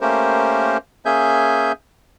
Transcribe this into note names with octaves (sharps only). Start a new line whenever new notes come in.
A3 A#3 C#4 G4 A#4 C5
A#3 C#4 G#4 E5 G#5 G6